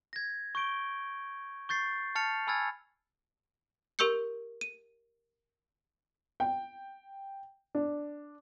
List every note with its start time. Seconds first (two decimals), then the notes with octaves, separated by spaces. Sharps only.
0.13 G#6 A#6
0.55 C#6 G6 D7 G7
1.69 C#6 G6 A6 C7
2.15 A5 F6 A6 C#7 F7
2.47 G#5 B5 E6 F6 G#6 A6
3.99 G4 A#4 C#6 E6 G6 C#7
4.61 D#7
6.40 G5
7.75 D4